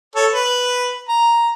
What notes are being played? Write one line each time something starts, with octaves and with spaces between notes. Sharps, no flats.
A4 C#5
B4
A#5